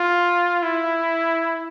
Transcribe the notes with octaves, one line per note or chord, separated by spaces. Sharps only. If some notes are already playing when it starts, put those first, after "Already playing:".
Already playing: F4
E4